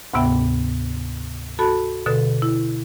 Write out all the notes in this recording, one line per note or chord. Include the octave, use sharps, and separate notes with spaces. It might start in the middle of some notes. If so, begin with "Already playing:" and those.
D2 G#2 C3 B3 E5 G5
F#4 A4 A5 B5
B2 D3 A4
E4